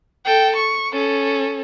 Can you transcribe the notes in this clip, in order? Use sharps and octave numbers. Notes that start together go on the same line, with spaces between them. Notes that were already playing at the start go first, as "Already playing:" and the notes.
A4 G5
C#6
C#4 A4